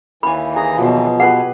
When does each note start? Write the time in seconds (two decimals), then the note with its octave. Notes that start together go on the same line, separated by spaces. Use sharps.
0.23 D#2 E3 F5 G#5 B5
0.56 G#4 A#5 D#6
0.78 B2 F3 F#3 C5
1.20 G4 G#4 B4 F#5